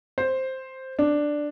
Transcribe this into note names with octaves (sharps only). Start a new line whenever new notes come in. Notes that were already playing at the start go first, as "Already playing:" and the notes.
C5
D4